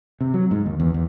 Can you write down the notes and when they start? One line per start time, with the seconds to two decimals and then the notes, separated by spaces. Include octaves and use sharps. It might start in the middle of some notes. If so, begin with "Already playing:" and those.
0.21 C3
0.34 F#3
0.51 G#2
0.66 D#2
0.80 E2
0.94 E2